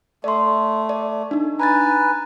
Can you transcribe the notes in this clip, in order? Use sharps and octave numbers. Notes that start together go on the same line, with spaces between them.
A3 D5 C6
D5
D4 D#4
B4 G#5 A#5 A6